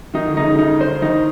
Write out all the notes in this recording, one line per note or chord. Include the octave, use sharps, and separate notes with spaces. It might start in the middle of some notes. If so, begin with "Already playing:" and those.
D#3 D#4
D3
C#3 D#4
D3
D#4
C5
D#3 D#4